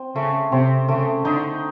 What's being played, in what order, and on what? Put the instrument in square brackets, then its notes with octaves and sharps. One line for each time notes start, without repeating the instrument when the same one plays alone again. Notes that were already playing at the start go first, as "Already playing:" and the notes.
Already playing: [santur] C4
[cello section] C#3 [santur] A3
[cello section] C3 [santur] C4
[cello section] C#3 [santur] A3
[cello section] D3 [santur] D#4